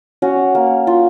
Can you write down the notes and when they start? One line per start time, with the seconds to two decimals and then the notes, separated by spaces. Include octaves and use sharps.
0.22 C#4 F#4
0.55 A#3
0.87 F4